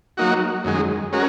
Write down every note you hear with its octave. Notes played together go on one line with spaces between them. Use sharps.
F#3 A#3 D#4 F#4
F#2 D#3 G#3
G#3 C#4 F#4 A#4